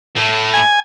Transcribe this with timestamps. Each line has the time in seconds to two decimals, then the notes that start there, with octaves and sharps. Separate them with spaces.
0.16 A2 A3
0.54 G#5